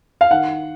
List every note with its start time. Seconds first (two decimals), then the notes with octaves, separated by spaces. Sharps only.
0.21 F5
0.31 D#3 F#5